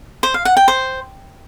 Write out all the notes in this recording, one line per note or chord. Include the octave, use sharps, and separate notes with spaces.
C5
F5
F#5
G5
C5